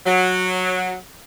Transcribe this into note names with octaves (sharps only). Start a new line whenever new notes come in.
F#3